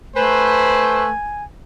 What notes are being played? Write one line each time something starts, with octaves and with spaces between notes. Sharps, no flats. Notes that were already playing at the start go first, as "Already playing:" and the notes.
A3 B4 C5 G#5